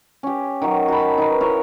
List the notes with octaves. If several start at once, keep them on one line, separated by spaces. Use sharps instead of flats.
C#4 G4
D#3 F#3
F#4 A5 B5
D#4 B4
E4 A#4 C#5